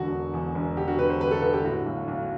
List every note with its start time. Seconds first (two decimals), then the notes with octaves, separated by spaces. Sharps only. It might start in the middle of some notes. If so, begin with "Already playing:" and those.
Already playing: E1 D3 F#4
0.12 E1
0.33 E2
0.55 E1
0.77 D3 G4
0.88 F#4
0.98 D3 B4
1.10 C5
1.20 G1 B4
1.27 G4
1.31 A4
1.42 D3 B4
1.53 G4
1.64 A2 F#4
1.86 B1
2.08 B1